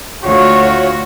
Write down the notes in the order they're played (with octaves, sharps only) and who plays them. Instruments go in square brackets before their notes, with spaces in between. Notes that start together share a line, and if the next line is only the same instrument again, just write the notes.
[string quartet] D2 [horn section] A3 F4 [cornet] F#4 [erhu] C#5